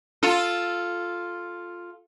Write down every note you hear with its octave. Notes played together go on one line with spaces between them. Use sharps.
F4 A4